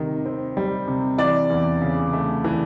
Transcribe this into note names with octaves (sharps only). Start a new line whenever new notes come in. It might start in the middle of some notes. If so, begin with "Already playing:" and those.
Already playing: C3 D#3 G3 D#5
C4
G3
C3
E3 D5
E2
C#3
A3
E3